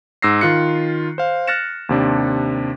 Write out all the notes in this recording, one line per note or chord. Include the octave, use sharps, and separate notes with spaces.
G#2 E6 A#6 C7
D#3 F4 F#6 C#7
C5 F5
F6 F#6 A6 A#6 C#7 E7
D#2 C3 D4